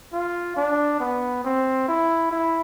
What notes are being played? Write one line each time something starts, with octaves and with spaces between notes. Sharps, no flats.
F4
D4
B3
C4
E4
E4